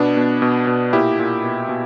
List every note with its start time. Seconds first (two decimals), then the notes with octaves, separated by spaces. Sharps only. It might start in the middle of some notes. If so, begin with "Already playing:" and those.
Already playing: B2 B3 D4
0.17 B2
0.42 B2
0.67 B2
0.93 A#2 E4 G4
1.19 A#2
1.43 B2
1.69 B2